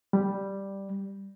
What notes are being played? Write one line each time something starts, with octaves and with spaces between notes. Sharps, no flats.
G3